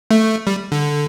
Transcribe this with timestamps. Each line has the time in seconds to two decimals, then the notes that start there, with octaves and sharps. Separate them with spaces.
0.11 A3
0.47 G3
0.72 D3